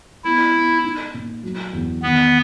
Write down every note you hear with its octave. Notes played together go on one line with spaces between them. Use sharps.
B3 E4
B3
D#4
A#2
F#3
E2
D#3 B3